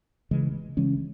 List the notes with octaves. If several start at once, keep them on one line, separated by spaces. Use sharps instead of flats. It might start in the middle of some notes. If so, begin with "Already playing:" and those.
C#3 E3 G#3
C#3 E3 G#3 C#4